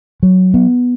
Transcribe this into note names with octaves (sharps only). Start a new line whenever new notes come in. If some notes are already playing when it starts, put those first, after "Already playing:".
F#3
B3